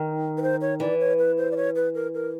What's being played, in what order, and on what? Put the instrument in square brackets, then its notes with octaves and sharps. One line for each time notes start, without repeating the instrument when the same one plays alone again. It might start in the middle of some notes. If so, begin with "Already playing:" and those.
Already playing: [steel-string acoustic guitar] D#3
[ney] B4
C5
C#5
[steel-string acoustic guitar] E3 [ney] D5
[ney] C#5
B4
C5
D5
C#5
B4
A#4
A#4